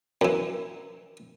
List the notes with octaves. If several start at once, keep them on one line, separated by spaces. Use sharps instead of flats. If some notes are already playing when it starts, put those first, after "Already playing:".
F#2 E3